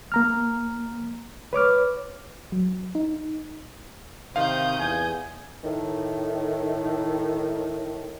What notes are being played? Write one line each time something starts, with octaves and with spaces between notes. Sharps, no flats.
A#3 A#5 F6
B4 C#5 D6 F6
F#3
D#4
C3 D#3 C5 F5 D#6 G6
E2 G#5
A2 D#3